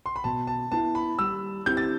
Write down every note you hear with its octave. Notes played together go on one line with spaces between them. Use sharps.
C6
B5
B2 A5
A5
B3 E4 A5
B5
G3 E6
C4 E4 G4 G6
A6